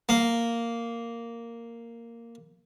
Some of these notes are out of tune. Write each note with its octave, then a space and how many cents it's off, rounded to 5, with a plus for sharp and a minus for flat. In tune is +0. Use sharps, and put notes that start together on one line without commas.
A#3 -5